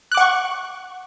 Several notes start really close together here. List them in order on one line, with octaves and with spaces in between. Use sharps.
F#6 D6 F#5 C#6